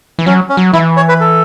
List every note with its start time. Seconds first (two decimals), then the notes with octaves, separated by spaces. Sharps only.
0.19 E3
0.26 F#3 C#4
0.49 C#4
0.57 F#3
0.73 E3 E4
0.97 C#5
1.09 B4
1.21 A4